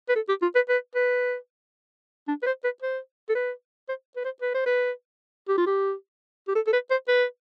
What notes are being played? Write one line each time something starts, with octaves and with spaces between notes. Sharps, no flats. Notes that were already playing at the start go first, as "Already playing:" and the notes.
B4
A4
G4
F4
B4
B4
B4
D4
B4
C5
B4
C5
A4
B4
C5
B4
C5
B4
C5
B4
G4
F4
G4
G4
A4
A4
B4
C5
B4